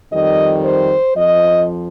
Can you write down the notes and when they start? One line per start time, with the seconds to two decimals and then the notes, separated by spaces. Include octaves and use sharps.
0.10 F2 D#3 G3 D#5
0.63 C5
1.15 F2 F3 D#5